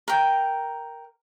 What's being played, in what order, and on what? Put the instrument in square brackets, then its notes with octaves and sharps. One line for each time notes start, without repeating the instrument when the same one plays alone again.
[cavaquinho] A#4 G5